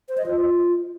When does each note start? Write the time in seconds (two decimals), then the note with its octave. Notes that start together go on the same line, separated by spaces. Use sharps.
0.09 C5
0.18 D#5
0.26 F4